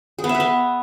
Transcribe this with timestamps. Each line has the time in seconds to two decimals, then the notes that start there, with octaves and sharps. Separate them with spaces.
0.19 G#4
0.24 B3
0.29 E5
0.35 B4
0.40 B3